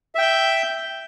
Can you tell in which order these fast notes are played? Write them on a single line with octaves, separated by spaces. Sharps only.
E5 G5 G6